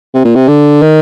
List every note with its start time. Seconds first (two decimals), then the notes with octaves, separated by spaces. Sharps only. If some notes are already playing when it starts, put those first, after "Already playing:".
0.14 C3
0.25 A#2
0.35 C3
0.48 D3
0.82 D#3